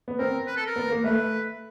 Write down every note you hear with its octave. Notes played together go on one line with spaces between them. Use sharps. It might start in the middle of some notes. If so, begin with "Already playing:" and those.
B3
C4 A#4
B4
A4
A#4
B3
A#3
A3 B4